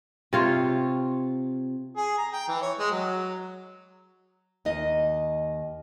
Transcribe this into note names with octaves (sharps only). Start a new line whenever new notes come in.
C3 F4 C#5
G#4
A#5
G5
E3
C#5
G#3
F#3
D#2 D#4 D#5